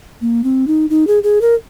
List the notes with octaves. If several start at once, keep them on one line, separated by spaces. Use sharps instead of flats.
A#3
C4
D#4
D#4
G#4
G#4
A#4